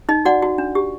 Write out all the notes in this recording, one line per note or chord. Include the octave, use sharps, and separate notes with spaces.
D#4 D#5
F#4 D5 F#5
F#4
D4
G4